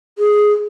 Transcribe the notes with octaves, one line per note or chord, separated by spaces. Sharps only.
G#4